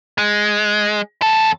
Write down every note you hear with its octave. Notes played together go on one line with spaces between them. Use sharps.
G#3
E2 A4